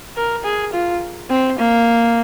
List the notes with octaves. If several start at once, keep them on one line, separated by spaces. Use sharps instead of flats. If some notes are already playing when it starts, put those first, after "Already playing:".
A#4
G#4
F4
C4
A#3